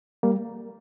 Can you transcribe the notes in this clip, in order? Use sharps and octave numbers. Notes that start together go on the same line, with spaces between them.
G3 A#3